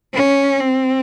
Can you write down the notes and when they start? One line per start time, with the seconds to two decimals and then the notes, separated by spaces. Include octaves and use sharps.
0.14 C#4
0.61 C4